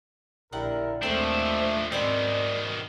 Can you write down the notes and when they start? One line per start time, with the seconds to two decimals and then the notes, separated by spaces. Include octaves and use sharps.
0.53 A#1 D3 E4 G4 A#4 F#5 G5
1.03 D#2 F3 G#3 A3 C4 D4 C5
1.92 G#2 B2 D#3 C4 D5 G#5 A#5